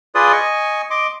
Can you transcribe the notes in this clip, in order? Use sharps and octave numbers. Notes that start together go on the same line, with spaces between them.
F4 G#4 B4 D5 C6 D#6
D#5 G#5 C#6
D#5 C6 D6